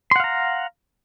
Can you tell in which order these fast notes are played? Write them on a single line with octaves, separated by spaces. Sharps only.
C6 F#5 F5 A#5